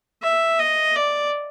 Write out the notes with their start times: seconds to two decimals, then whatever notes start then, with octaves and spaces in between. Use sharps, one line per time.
0.23 E5
0.59 D#5
0.96 D5